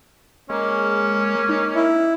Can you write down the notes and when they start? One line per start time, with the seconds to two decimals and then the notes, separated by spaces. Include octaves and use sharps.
0.50 G#3 A#3 C#4
1.49 D#4
1.75 E4